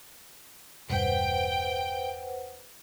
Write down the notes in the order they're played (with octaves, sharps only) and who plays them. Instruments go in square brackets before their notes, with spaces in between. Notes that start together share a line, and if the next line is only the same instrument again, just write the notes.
[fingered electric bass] E1 G2 [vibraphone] B4 C5 F#5 [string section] G5